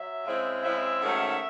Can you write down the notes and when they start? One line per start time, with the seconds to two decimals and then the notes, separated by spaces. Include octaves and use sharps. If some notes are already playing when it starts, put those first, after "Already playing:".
Already playing: F#3 E5
0.24 C#3 G#3 C4 E4
0.62 C#3 G#3 C4 E4 E5
1.01 G#2 D#3 F#3 A3 C#4